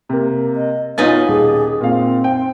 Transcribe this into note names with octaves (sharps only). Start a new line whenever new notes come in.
C3 A#3
D#5
B2 D#4 F4 B4 C#5 G#5 A6
D#1 G#4
A#2 C4 F5
G5